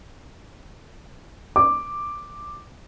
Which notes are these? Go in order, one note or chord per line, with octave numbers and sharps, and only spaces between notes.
D6